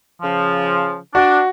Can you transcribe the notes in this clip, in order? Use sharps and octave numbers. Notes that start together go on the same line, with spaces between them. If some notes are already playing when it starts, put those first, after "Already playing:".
C#3 F3
D4 F#4